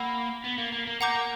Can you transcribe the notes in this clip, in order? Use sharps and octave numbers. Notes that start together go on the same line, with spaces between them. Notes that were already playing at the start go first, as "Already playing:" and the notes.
Already playing: A#3 F#5 B5 E6
B3
A#3
A#3
A#3
A#3 F#5 A#5 D6 G6